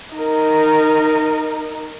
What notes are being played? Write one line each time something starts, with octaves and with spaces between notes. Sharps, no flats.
D#4 A#4